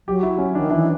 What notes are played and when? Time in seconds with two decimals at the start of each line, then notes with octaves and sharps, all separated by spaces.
0.07 F#3 G4
0.23 E4
0.38 C#4
0.55 D4
0.59 D#3
0.70 E3 D4